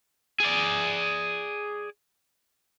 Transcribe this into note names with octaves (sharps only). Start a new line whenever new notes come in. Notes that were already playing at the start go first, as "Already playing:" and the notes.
G#4 D5